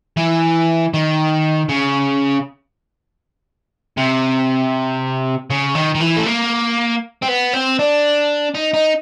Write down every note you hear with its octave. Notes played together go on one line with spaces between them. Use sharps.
E3
D#3
C#3
C3
C#3
D#3
D#3
E3
A3
A#3
C4
B3
C4
D4
D#4
D#4